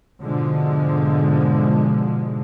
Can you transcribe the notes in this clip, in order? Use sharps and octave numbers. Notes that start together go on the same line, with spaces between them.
G#2 B2 D3 F3 G#3